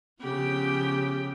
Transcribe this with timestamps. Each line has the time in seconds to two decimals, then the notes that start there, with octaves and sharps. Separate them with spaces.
0.21 C#3 F3 B3 G4 G5